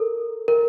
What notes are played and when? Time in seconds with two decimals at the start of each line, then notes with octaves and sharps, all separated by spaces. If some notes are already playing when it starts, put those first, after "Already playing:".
Already playing: A4 A#4
0.48 A#4